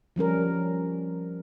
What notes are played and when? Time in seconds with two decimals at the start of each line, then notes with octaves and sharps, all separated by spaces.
0.16 F3 G3 C#4 A#4